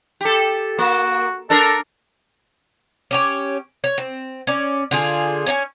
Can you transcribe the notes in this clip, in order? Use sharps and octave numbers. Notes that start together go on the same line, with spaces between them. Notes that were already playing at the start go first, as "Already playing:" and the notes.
G4 A4
A#3 F#4
D4 A4 A#4
C#4 G4 C#5
C#5
C4
C#4 D5
D3 F4 G#4
C#4 C#5 D#5 G#5